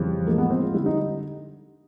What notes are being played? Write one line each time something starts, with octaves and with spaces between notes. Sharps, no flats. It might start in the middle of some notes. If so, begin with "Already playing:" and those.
Already playing: F2 C#3 E3 G3
A2 F3 G#3 A#3
B3
C4
F4
D3 G3 E4
D#4